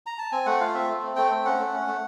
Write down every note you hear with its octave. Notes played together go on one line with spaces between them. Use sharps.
A#5
A5
C4 G#5
A3 F#5
F4 F5
C4 E5
A3
C4
A3 G5
C4
C#4 F#5
A3
C#4
A3